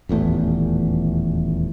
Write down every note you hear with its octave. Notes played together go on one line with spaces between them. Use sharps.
D#1 A1 E2 A3